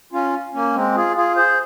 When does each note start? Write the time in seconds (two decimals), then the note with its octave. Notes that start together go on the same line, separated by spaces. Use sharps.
0.13 C#4 F4
0.54 A#3 C#4
0.74 G#3 C4
0.96 F4 G#4
1.16 F4 G#4
1.36 G#4 C5